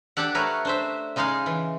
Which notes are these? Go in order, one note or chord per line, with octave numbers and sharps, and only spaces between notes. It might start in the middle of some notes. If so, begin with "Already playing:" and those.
D4 G4 A4 F#5
A3 A#4 B4 C#5
D4 C5 E5
C#3 G#3 D#4 G#4 F5
E3